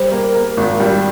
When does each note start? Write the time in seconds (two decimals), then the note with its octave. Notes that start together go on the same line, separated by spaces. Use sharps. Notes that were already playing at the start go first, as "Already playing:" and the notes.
Already playing: G3 C5
0.12 A#3
0.35 A#3
0.57 G#1
0.80 G3